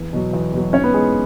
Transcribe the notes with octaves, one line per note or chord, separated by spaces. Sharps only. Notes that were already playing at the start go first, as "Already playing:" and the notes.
Already playing: E2
B2 F#3
E2
B2 F#3
G#2 C#4 C#5
B3 B4
E3 G#3 G#4